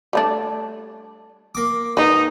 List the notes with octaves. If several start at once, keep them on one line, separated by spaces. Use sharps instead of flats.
G3 A3 D4
A#3 D6
G#2 D#4 B4 D#5